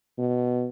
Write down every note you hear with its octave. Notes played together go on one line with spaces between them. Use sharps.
B2